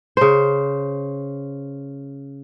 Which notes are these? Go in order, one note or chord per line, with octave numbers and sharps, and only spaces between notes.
C#3 C5